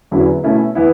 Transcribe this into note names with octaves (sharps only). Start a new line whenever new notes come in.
E2 D3 F#3 C#4 E4
B2 A3 C#4 E4
E3 B3 E4